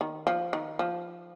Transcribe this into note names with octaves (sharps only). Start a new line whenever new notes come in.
D#3
F3
D#3
F3